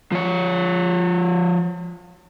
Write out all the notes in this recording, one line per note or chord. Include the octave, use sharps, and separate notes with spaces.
F3 C#5